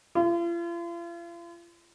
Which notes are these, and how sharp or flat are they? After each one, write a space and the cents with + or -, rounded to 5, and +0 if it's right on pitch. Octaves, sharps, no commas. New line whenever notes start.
F4 -40